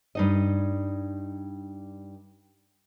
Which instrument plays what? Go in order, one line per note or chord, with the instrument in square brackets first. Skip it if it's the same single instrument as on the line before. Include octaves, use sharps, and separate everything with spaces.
[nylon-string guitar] G2 D#4 D#5